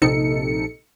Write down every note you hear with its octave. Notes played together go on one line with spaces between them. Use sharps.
A#1 C3 D#4 A4 C#7